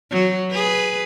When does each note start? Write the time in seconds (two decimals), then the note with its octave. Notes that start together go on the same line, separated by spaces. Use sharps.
0.11 F#3
0.51 G#4 B4